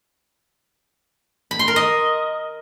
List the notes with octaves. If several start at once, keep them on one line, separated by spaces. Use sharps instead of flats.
B5
C6
A#4
D#5